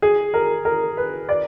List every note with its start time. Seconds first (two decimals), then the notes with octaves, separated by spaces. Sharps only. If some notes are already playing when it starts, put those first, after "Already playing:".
0.02 G#4
0.34 A#4
0.65 A#4
0.97 B4
1.29 D5